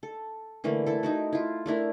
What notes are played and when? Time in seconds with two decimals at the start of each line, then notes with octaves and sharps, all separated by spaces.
0.03 A4
0.64 D3 E3 A3 A#3
0.86 E4 A4
1.03 D#4 E4 F#4
1.33 E4 F4
1.66 A3 D4 E4 A#4